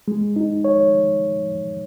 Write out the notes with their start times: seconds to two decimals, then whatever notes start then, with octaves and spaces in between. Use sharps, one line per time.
0.08 G#3
0.36 D#4
0.64 C#5